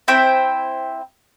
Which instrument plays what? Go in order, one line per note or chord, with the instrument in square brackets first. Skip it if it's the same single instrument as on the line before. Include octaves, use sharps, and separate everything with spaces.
[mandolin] C4 E4 C5 G5